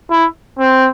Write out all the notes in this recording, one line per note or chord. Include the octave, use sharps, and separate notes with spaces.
E4
C4